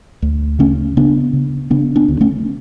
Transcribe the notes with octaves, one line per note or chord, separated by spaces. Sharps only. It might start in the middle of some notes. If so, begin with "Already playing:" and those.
D2
C#3 A3 C#4
C#3 B3 D4
C#3
C#3 B3 D4
B3 D4
D2
A3 C#4